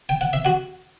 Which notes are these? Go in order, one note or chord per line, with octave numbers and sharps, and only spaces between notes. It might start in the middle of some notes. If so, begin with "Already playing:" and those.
G5
F#5
E5
F#4 F#5